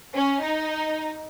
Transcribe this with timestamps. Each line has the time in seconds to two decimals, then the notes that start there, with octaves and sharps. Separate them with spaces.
0.15 C#4
0.44 D#4